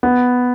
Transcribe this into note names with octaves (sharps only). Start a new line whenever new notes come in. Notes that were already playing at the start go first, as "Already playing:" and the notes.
B3